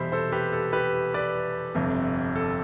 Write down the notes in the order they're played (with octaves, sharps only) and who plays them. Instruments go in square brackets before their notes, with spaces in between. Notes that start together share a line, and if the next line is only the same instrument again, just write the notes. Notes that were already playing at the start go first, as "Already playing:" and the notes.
Already playing: [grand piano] F1 E2 B2 G3 C5 E5 B5
A4 C5
G4 B4
A4
G4 B4
B4 D5
G1 F2 C3
A4